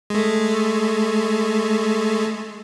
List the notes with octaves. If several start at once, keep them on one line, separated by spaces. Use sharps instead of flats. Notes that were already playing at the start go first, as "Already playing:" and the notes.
G#3 A3